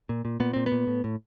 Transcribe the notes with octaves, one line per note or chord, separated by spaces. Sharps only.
A#2
A#2
A#2 B3
A#2 C4
B3
A#2
A2
A2